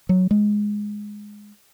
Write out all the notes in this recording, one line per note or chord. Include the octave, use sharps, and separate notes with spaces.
F#3
G#3